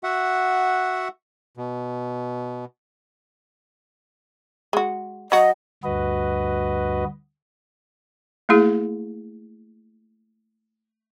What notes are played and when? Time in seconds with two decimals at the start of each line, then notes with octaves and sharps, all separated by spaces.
0.03 F#4 E5 F#5
1.57 B2
4.73 G#3 F#4
5.32 F#3 F#4 D#5
5.84 D2 G2 F#4 B4 D#5
8.49 A3 A#3 E4 G#4